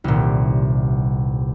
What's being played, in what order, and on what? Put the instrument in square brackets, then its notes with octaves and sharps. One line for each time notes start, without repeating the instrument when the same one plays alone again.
[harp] D#1 C2